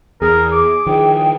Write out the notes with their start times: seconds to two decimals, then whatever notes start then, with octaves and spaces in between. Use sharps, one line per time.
0.22 E2 G#4 A#4
0.52 D6
0.87 D#3 F3 G5